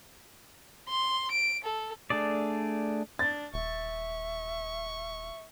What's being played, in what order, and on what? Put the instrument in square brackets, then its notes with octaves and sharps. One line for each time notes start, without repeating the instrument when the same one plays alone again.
[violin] C6
D7
A4
[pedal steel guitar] A3 D4 G#4 D5
[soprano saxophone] D4 [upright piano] A6
[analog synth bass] D#1 [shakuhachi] E5 [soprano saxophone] C#6